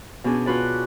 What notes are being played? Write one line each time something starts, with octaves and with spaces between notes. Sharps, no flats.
B2 C#4 D4 G#4
F4 F#4 B4 D5